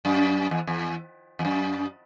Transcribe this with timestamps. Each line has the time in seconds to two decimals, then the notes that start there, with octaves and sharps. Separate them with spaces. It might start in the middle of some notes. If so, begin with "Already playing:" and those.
0.05 F#2
0.51 E2
0.67 E2
1.39 E2
1.45 F#2